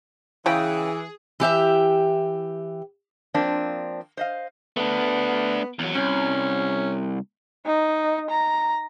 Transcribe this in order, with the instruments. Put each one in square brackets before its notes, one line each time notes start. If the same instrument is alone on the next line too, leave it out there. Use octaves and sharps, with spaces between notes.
[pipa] C#3 G5 [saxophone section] E3 [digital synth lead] G#4
[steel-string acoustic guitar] E3 G4 E5 G5
[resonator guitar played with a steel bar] F3 A#3 C4 D4
C5 D#5 F5
[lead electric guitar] A3 D4 [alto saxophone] B3
[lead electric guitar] E2 F#3
[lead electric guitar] C2 [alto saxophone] C#4
[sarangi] D#4
A#5